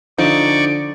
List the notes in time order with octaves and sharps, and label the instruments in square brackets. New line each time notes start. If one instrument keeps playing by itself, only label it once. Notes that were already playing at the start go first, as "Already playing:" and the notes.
[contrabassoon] D3 [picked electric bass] F3 [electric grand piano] D#4 [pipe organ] D5 C#6 D6